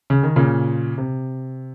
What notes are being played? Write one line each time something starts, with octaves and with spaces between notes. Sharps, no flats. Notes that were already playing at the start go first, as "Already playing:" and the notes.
C#3
D#3
A#2 C#3
C3